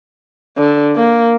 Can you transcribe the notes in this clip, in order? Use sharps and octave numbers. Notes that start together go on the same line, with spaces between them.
D3
A#3